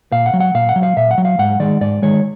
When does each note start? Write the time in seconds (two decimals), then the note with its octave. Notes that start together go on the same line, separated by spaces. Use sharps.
0.12 A#2 F5
0.26 F#5
0.34 F#3
0.40 F#5
0.54 A#2 F5
0.69 F#5
0.76 F#3
0.83 F5
0.97 A#2 E5
1.11 F#5
1.18 F#3
1.25 F5
1.39 G#2 F#5
1.60 D#3 G#3 D5
1.81 G#2 D5
2.02 D#3 G#3 C#5